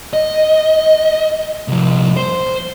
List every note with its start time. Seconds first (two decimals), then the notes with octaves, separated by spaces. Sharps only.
0.13 D#5
1.68 C2 F3
2.17 C5